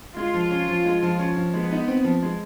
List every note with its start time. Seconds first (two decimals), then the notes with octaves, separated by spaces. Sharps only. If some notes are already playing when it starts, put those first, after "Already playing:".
0.16 G#3 F4
0.34 F3
0.51 C#4
0.68 F3
0.85 G#3
1.03 F3
1.19 C#4
1.36 F3
1.53 G#3 B3
1.71 D#4
1.88 C4
2.04 F3
2.22 G#3